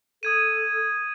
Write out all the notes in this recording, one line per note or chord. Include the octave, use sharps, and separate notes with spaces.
A4 D#6 G#6 D#7